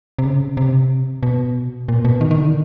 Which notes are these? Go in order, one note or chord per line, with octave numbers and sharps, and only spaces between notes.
C3
C#3
C3
B2
A#2
B2
D#3
D#3
D3
D#3